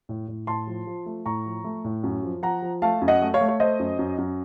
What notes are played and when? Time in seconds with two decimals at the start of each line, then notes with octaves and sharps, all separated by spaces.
0.09 A2
0.28 A2
0.47 A2 A5 C6
0.67 F3
0.87 F3
1.06 A3
1.26 A2 A#5 C#6
1.46 F3
1.64 A3
1.84 A2
2.04 F#2
2.23 F3
2.42 F3 F#5 A#5
2.62 F3
2.82 A3 F5 A5
3.02 F#2
3.08 D#5 F#5
3.22 A3
3.34 C#5 F5
3.41 A3
3.48 C#5
3.60 A3 C5 D#5
3.80 F#2
3.99 F#2
4.18 F#2